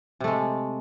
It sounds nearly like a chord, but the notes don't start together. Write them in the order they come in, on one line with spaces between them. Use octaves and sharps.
C3 A3 G#3